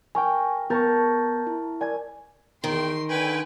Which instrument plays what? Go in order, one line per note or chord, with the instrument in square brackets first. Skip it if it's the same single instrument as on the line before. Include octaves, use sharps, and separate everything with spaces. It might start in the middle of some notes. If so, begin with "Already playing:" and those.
[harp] A#4 G5 [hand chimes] G#5 C#6
[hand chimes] B3 G6 A6 [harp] A#4 A5 C#6
[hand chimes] E4
[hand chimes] A#4 D5 [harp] G#5 G#6
[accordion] E2 G5 [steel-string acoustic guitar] D#3 [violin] C6
[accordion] D3 G5 G#5 [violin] B4